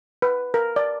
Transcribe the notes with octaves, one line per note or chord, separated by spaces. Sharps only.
B4
A#4
D5